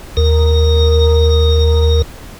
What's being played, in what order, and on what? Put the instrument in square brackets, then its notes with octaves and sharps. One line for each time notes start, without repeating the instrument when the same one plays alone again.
[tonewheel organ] D#2 A#4